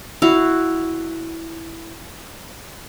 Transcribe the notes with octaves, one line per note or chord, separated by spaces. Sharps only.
E4 F#4 F5